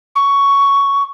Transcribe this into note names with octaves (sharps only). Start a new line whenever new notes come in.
C#6